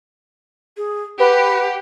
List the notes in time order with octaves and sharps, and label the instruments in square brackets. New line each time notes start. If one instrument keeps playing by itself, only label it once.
[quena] G#4
[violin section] G4 [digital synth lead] B4 [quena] F#5